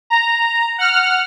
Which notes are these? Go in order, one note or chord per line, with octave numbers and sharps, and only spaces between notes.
A#5
F#5 F6